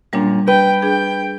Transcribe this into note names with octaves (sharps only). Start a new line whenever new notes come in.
F#2 A#2 G3 D4
B4 G5
D4 G#4 G5